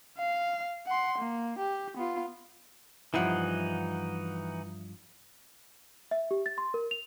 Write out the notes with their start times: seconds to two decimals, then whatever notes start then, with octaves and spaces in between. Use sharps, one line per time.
0.18 F5
0.87 F#5 C6
1.18 A#3
1.59 G4
1.97 B3 F4
3.14 G2 E3 F3 D#4 E4 F#5
6.11 E5
6.31 G4
6.46 A6
6.58 C6
6.74 A#4
6.91 F7